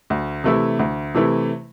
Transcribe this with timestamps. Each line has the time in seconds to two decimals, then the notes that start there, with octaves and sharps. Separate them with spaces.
0.10 D2
0.44 C3 E3 A3 E4
0.79 D2
1.15 C3 E3 A3 E4